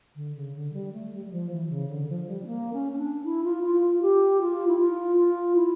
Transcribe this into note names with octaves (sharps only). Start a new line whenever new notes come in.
D3
C#3
D3
G3
A3
G3
G3
F3
E3
C#3
D3
F3
G3
C#4
A#3
C#4
C#4
D4
E4
F4
F4
F4
G4
F4
E4
F4
F4
E4